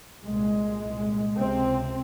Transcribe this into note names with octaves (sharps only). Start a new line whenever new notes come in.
C2 A#2 G#3
C2 A#2
C#2 C3 C4